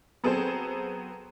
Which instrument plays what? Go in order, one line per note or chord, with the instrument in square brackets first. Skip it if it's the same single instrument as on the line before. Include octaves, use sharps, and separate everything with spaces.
[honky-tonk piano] F#3 B3 C4 G#4 A4 C5